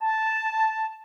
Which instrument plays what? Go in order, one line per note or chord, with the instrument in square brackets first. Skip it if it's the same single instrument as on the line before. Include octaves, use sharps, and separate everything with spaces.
[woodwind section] A5